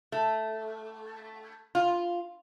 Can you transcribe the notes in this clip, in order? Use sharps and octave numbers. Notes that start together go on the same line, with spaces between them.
A3
F4